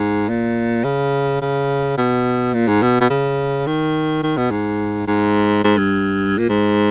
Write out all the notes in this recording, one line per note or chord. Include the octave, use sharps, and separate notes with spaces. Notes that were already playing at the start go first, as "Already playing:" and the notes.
Already playing: G#2
A#2
C#3
C#3
B2
A#2
G#2
B2
B2
C#3
D#3
D#3
B2
G#2
G#2
G#2
G2
A#2
G#2